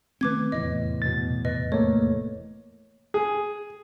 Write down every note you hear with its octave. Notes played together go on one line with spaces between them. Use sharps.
D#3 A3 C4 B4 D6 G#6
F1 E2 A2 D#5
B2 A6
B4 D#5
A3 A#3 C#5
G#4